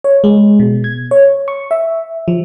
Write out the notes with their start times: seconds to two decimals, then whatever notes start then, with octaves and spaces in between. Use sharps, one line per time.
0.04 C#5
0.24 G#3
0.60 B2
0.84 G#6
1.11 C#5
1.48 C#6
1.71 E5
2.28 F3